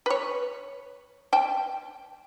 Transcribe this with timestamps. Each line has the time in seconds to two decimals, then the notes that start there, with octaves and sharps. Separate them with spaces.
0.06 B4 C#5
1.33 G5 A5